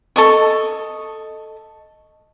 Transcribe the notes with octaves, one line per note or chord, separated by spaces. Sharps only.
A4 D#5 C#6